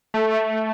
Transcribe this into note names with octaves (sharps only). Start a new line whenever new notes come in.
A3
A3